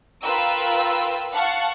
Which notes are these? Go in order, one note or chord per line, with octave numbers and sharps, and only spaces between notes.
F4 A#4 B4 G5 A#5 E6
F5 F#5 A5 C#6